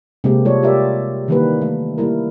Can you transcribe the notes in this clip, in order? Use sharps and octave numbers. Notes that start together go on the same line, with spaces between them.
C3 G#3 A#3 C4 G4
G3 F4 A4 C#5 D5
F4 G4 A#4 D5 E5
D#3 E3 G3 A#3 G4 B4
A3
G3 A#3 E4 A#4